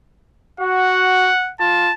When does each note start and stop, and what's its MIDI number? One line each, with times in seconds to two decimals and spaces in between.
0.60 1.31 66
0.60 1.52 78
1.60 1.91 65
1.60 1.94 81